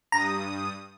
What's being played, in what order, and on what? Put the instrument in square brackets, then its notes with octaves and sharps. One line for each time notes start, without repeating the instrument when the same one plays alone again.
[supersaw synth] G2 D#6 [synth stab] A#5